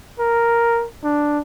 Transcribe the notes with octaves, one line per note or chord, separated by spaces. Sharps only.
A#4
D4